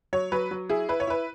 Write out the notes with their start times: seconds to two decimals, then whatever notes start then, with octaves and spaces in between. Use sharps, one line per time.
0.13 F#3 C#5
0.32 F#3 B4
0.51 F#3
0.69 E4 G#4
0.89 E4 B4
1.00 C#5
1.07 E4 B4